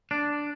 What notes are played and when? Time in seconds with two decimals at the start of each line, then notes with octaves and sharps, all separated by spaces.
0.11 D4